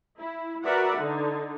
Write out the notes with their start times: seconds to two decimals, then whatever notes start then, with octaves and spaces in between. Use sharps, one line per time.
0.19 E4
0.63 F#4 A#4 B4 D5 E5 F#5
0.97 D3 D#4